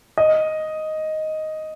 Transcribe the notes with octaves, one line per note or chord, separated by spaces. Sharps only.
D#5